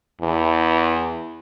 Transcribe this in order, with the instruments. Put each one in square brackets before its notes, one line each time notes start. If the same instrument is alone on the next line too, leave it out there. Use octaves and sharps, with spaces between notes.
[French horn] E2